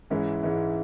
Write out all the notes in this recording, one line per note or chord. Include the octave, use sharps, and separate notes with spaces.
G#2 E3 G#3 C#4 E4
G#2 E3 G#3 C#4 E4